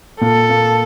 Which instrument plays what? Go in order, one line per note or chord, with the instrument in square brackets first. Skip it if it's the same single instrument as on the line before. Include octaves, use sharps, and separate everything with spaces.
[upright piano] A#2 [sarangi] A4
[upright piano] A#3